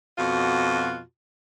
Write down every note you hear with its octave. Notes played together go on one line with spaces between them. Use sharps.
F2 B2 F4 F#4